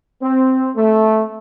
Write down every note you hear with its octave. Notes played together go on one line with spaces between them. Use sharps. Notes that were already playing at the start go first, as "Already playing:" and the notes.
C4
A3